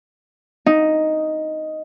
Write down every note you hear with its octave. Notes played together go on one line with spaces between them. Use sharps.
D#4